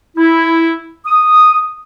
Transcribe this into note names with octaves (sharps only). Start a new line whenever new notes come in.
E4
D#6